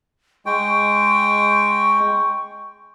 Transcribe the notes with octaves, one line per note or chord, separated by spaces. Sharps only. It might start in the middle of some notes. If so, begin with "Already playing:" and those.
G#3 G5 C#6